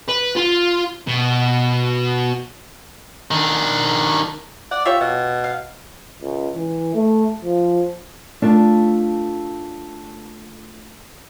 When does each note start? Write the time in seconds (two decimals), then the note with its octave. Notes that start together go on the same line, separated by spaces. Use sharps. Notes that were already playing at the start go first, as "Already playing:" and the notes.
0.08 B4
0.36 F4
1.07 B2
3.31 D#3 D4
4.71 D5 F#5
4.85 F4 G4 C#5 E5
5.01 B2
5.44 F5
6.22 C#2
6.55 E3
6.95 A3
7.44 F3
8.42 A3 D4 F4 A4